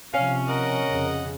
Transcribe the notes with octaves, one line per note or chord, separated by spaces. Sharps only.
C3 F3 C#4 F5
A#4 D#5 F#5
F2 C#3